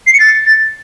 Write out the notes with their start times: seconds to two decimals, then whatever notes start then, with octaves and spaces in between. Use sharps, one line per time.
0.07 C7
0.13 C#7
0.20 A6